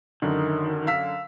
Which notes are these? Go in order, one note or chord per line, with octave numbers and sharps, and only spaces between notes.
F#2 D3 D#3
F5 E6 B6